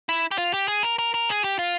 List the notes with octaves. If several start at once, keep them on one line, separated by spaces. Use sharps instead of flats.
E4
G4
F4
G4
G#4
A#4
A#4
A#4
G#4
G4
F4